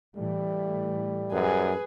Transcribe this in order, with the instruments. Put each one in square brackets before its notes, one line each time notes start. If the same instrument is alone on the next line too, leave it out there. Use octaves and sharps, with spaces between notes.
[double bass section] A2 E3 A3 [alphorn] G3
[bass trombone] F#2 [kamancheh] G#4 B4